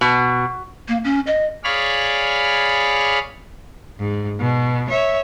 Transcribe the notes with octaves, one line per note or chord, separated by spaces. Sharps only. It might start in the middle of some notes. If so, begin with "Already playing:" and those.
B2
A#3
C#4
D#5
G#4 C#5 D5 F5 B5 F6
G#2
B2
C#5 E5